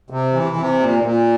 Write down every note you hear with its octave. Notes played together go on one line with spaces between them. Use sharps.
C3
E3
C3
A#2
A#2